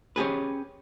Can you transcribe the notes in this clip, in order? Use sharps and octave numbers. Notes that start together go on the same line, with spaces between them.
C#4 G4 G#4 B4